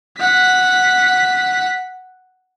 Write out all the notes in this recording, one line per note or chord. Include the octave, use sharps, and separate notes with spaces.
F#5 B6